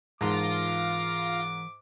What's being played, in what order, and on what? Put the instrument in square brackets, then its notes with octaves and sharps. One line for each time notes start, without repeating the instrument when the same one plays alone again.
[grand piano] G#2 [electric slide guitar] E3 A#4 A5 [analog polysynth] F4 A#6 [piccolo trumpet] D6